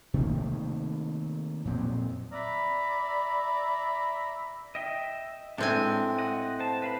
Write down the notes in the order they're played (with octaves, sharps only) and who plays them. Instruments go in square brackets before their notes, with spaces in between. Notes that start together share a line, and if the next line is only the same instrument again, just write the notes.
[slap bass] C3 D#3 A3 A#3
F2 A#2 F#3 C4
[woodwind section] D5 E5 A#5 B5
[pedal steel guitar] D#5 E5 G5
[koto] A2 C4 G#5 [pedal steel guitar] G#3 D4
[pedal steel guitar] D#5 F#5
C5 A5
B4 F5 B5